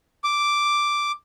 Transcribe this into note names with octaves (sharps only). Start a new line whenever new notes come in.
D6